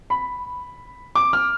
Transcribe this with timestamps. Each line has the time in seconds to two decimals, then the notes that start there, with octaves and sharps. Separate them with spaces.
0.10 B5
1.15 D6
1.33 F6